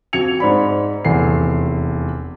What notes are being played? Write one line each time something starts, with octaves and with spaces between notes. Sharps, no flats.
F2 F#4 G#6 C#7 F7
G#2 C5 D5 B5
F1 E2 A4 C7